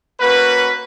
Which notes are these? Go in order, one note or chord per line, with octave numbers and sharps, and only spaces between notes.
A#3 C#4 F#4 B4